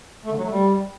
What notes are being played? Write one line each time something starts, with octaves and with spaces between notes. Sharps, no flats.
A3
D3
F#3
A3
G3